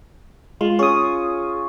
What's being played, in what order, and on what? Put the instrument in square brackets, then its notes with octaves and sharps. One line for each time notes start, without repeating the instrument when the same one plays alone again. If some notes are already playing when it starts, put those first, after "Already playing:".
[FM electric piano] G#3 [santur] F4
[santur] C#4 [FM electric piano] G#4 D#6